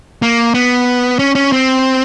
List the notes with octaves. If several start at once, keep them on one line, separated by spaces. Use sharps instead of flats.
A#3
B3
C#4
C#4
C4